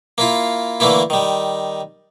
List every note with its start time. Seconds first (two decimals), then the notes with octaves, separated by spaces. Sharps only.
0.18 A#3 E4 F4
0.80 D3 E3 A3 A#3 E4
1.10 D#3 G3